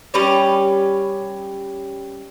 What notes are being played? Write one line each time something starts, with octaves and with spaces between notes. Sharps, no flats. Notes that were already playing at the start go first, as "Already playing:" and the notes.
G3 C#4 B4 C#5